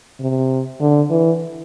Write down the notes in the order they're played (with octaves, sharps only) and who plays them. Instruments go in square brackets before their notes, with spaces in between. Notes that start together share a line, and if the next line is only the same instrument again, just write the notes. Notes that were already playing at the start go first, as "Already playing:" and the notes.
[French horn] C3
D3
E3